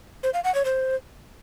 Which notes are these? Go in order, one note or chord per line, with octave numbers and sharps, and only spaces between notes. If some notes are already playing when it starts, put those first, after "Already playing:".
C5
F5
F#5
C#5
C5